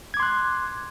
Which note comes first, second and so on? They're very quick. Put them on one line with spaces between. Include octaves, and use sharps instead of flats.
G#6 D6 C6 F#6